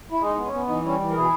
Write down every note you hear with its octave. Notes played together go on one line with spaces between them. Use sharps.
E4
G#3 D#4
B3
C#4
B3
E3 D#4
G3 C#4 E4
E3
A#4
B2 E4 G#4